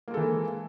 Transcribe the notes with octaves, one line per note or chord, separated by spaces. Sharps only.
E3 G#3 A#3 A4